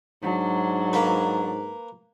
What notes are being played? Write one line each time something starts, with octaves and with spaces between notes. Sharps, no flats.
G#2 F#3 D4
A#3 B4